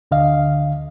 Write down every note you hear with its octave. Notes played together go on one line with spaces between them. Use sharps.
D2 D3 D#5 F5